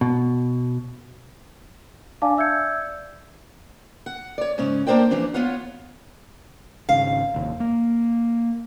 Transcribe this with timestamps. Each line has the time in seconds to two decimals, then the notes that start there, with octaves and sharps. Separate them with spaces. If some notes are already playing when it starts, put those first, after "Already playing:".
0.01 B2
2.22 D4 D5 F5 G#5 A5 D6
2.37 D5 E5 E6 G6 G#6 C#7
4.06 F#5
4.38 C#5 D5
4.58 G#2 C#3 C#4
4.87 A#3 D4 A#4 C5 D5 G5
5.11 E3 F3 C4 D4
5.34 B3 F4 C#5 F5 F#5
6.89 G#1 C#3 F5
7.34 F1 D#2
7.60 A#3